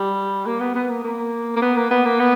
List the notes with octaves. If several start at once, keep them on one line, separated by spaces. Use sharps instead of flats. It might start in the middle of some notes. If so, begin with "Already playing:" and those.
Already playing: G3
A#3
B3
B3
A#3
A#3
A#3
B3
A#3
B3
A#3
B3